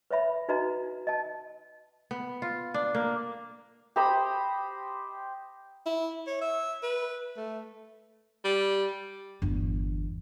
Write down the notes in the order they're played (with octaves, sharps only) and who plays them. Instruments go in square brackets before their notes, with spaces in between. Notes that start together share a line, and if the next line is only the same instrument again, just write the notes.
[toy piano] B4 C#5 E5 B5
D#4 F#4 B4 D#5 A#5
D#5 A5
[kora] B3
F4
D4
A#3
[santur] G4 C5 D#5 B5
[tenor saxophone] E4
C#5
E5
B4
A3
[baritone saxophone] G3
[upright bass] G1 E2